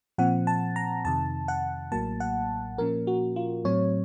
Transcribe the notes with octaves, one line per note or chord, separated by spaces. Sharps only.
A#2 F3 C4 F#5
A5
A#5
F2 C3 D#3 A5
F#5
A1 A2 F#3 A#3 A5
F#5
A#2 F3 A#3 C#4 A#4
F#4
F4
A2 F#3 C4 C#5